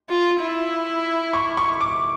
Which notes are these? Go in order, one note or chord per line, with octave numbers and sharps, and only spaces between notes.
F4
E4
C#6
C#6
D6